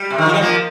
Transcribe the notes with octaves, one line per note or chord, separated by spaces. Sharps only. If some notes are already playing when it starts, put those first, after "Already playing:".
Already playing: G3
C3
D#3
F3
G3
F3 A#3